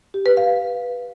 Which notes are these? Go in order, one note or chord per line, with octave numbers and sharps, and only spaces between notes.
G4
B4
F5